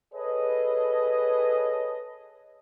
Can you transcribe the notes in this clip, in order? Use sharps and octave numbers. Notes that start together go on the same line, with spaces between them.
G#4 A4 B4 C#5 D#5